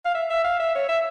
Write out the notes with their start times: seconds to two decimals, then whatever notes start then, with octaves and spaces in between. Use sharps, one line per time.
0.05 F5
0.15 E5
0.30 E5
0.44 F5
0.60 E5
0.75 C#5
0.89 E5